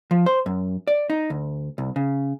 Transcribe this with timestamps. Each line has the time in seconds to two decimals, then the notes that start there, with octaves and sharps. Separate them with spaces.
0.11 F3
0.26 C5
0.46 F#2
0.88 D5
1.10 D#4
1.30 D2
1.78 C2
1.96 C#3